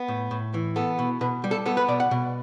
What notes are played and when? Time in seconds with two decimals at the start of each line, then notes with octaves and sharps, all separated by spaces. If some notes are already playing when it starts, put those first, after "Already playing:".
Already playing: B3
0.08 A2
0.31 A2
0.54 E3
0.76 B3 A4
0.99 B2
1.21 B2 B4
1.44 G3
1.51 A4
1.66 B3 A4
1.77 B4
1.88 B2 D5
2.00 F#5
2.11 B2